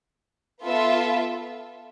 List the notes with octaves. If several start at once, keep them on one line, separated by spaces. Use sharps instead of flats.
B3 F4 A4 E5